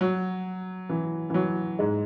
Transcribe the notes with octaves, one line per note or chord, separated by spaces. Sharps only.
F#3
E3
E3
F#3
G#2 G#3